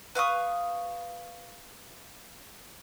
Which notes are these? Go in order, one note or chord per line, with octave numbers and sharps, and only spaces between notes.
B4 F5 C#6 D#6